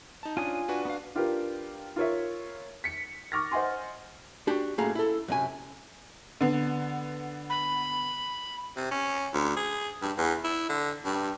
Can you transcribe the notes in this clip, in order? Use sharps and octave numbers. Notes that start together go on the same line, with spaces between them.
D#4 A5
C#4 D4 F4 G#5 D#6
D4 F#4 B4
B3 F5
D4 F4 G4 A#4 B4
F4 A#4 C#5 E5
B6 C#7
C#6 D6 F6 A6 A#6
C5 D#5 F#5 G#5 C6
D4 F#4 G4
F#2 A2 A#3 G#4 F5 A#5
E4 A4
F#2 C3 G#5
D3 B3
B5
C3
C#4
D2
G#4
G2
E2
E4
D3
G2